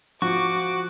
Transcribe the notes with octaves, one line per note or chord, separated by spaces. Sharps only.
F3 F#4 C#6 D6